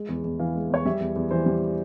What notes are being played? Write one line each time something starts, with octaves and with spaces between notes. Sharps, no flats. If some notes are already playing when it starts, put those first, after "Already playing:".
Already playing: G#3
E2
E2
E3 F5
G#3
E2 C#5
G3 E5
E2
E2
E3 C5
G3